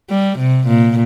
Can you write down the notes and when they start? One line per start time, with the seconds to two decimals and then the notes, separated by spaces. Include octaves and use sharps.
0.10 G3
0.39 C3
0.68 A#2